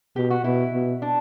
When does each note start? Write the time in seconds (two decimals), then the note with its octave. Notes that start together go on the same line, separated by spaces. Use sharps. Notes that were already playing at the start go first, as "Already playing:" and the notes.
0.16 B2 G4
0.30 F#4
0.44 B2 E4
0.74 B2
1.02 D4